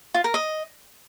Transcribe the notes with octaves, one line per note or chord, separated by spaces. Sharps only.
F4
A#4
D#5